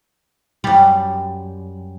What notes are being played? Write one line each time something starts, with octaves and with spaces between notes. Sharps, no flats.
F#2 G3